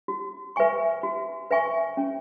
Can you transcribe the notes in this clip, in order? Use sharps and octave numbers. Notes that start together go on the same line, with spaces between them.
F#4
B4 E5 G#5 C#6
F#4
B4 E5 G#5 C#6
C#4